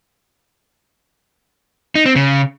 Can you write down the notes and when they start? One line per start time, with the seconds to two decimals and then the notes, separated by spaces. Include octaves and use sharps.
1.95 D#4
2.06 C4
2.16 C#3